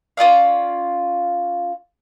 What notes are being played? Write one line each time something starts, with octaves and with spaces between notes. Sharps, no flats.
C#4 F4 D5 F5